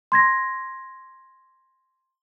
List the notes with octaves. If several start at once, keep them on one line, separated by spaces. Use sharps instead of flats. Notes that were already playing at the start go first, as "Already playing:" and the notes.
C6 G#6 A#6